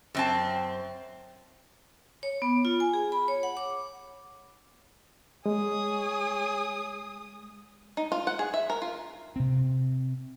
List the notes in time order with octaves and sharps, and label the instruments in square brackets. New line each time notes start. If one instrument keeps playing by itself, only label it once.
[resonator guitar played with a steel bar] F#2 C4 A5
[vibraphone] C#5
B3
F4
G#5
G#4
B5
C#5
F#5
D6
[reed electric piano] G#3 [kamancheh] G#4 D#6 [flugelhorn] C#5
[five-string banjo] D#4
F4
F#5
G#4
E5
A#4
F4
[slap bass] C3 C4